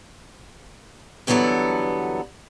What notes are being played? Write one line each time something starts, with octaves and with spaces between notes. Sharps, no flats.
G2 D3 E3 F#3 B3 A4